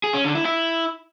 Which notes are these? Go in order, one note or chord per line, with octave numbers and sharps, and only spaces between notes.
G#4
C#4
D3
E4
E4